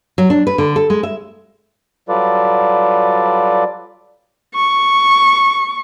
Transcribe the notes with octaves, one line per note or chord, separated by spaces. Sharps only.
F#3
D4
B4
D3
A4
G#3
E5
F#3 G3 F4 A4 B4 D5
C#6